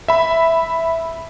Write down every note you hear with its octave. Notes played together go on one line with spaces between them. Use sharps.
E5 B5